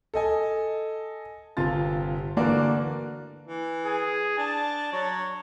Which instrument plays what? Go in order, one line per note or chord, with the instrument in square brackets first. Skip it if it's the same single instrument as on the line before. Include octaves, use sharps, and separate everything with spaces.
[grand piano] A4 D#5 G#5
G1 C3 F4 A6
D3 E3 A#3 F#4 D5
[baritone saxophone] E3
[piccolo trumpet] G#4
[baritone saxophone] D4 [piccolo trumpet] A5
[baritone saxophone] F#3 [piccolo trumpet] C#5